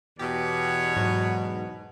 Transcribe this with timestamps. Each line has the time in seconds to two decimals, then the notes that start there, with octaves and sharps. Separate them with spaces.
0.19 E2 B2 G4 C#5
0.96 G#2 F#3 F#4